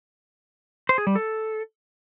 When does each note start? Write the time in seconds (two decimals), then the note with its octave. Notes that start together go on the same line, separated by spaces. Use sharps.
0.89 C5
0.98 G#4
1.07 G3
1.15 A4